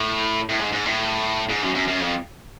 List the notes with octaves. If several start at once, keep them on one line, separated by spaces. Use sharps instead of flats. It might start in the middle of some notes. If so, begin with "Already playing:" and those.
Already playing: A2
A2
G#2
G#2
A2
G#2
F#2
F#2
F#2
F2